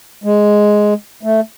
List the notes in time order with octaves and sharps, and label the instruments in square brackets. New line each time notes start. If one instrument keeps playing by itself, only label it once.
[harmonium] G#3
A3